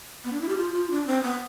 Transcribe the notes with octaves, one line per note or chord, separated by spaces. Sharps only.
B3
D4
E4
G4
F4
F4
D4
C4
B3